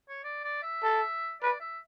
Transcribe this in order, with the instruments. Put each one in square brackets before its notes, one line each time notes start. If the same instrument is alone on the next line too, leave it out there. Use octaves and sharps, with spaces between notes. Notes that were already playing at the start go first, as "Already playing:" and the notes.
[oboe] C#5
D5
D5
E5
[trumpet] A4
[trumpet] B4 [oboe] D5
[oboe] E5